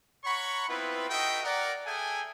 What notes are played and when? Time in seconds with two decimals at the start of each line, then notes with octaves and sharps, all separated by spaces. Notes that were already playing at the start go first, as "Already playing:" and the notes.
0.24 C#5 F#5 A#5 B5 C#6
0.68 B3 C4 E4 F4 B4
1.09 D#4 F#4 A4 D#5 E5 G5
1.43 A#4 D5 F#5
1.86 G#4 A4 E5 G5 G#5